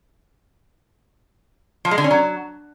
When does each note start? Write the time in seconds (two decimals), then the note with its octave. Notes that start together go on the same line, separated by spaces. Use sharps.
1.85 F3
1.91 G#3
1.98 D3
2.04 C#4
2.11 F#3